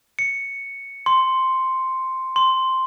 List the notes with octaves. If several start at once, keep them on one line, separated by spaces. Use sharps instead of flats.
C#7
C6
C6